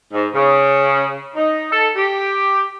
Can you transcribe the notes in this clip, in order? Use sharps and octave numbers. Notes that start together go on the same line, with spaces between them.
G#2
C#3
D#4
A4
G4